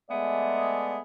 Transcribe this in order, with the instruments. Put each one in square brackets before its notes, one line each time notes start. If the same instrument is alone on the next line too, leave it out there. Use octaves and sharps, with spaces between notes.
[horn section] G#3 A3 B3 G#4 D5 E5